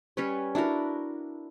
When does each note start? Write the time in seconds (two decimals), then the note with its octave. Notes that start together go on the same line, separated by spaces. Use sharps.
0.17 G3 C#4 B4 C#5
0.55 D4 E4 F#4 A#4